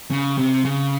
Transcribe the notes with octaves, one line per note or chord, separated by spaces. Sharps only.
C#3
C3
C#3